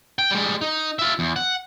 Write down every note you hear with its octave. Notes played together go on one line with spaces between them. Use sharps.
G5
G3 G#3
D#4
F4 E5
E2
F#5